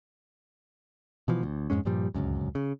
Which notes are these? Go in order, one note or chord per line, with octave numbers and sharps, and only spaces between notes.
B2 E3 F3
D2
F2 G#2 G#3 C#4
G2 A#2 F3 G3
D1 G1 C#2 F#2
C#3